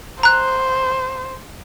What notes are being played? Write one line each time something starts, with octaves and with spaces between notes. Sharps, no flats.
C5 A#5 F#6